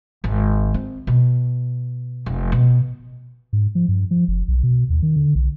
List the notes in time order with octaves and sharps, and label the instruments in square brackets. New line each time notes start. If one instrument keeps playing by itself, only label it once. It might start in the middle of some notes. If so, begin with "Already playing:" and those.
[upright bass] G#1
C4
B2
F1
B2
[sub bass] G#2
F3
G2
F3
F#1
B1
B2
D#2
D#3
D3
B1